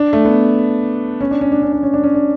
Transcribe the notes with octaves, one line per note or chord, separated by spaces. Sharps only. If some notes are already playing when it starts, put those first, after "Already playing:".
Already playing: D4
A3
B3
C#4
D4
C#4
D4
C#4
D4
C#4
D4
C#4
D4